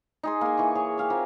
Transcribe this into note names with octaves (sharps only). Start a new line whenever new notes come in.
D#4 G#4 C6
A#3 G#5
E3 C#6
G#4 C#5
G4 F5 G#5
A#3 C4 F4